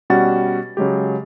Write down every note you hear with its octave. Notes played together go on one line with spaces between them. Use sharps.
B2 G3 C#4 F#4 F#5 A6
C#3 F#3 G#3 G4